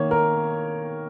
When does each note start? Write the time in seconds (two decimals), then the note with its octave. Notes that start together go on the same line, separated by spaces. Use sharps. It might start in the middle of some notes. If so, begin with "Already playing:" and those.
Already playing: D#3 A#3 C#5
0.11 A#4